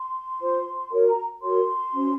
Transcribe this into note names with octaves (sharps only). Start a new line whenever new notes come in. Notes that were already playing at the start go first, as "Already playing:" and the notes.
Already playing: C6
F4 C5
F#4 A#4 C#5
A#5
F#4 A#4 C#5 C6
C#4 F#4 C5